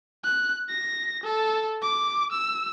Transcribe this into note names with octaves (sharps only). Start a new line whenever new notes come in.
F#6
A#6
A4
D6
E6